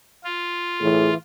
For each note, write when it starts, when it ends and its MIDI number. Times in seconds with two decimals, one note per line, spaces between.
0.24 1.14 65
0.81 1.11 45
0.81 1.17 52
0.81 1.11 68